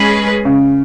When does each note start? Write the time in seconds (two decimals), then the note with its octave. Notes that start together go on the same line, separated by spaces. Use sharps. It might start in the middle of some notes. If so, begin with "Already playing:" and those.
Already playing: G#3 C#4 G#4 B4
0.45 C#3